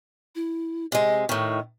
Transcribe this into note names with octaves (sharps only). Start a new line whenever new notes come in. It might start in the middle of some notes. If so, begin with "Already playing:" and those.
E4
C3 G#3 D#5
A2 D#3 C#6